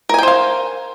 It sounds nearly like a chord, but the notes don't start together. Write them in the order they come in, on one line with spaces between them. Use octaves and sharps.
A#4 G#5 G5 C5 F5